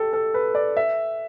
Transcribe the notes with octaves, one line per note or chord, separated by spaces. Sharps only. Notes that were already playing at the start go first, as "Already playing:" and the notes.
Already playing: G4 A4
A4
B4
D5
E5